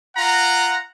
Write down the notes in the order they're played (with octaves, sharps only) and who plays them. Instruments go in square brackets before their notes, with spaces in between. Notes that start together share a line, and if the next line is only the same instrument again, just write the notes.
[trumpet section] F4 F#5 A#5